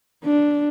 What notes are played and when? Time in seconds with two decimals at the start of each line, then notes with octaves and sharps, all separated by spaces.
0.24 D4